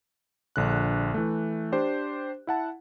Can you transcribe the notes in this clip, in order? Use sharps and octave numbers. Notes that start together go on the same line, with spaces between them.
A#1 D3 F#6
E3 A3
D4 G4 C5
E4 F#5 A5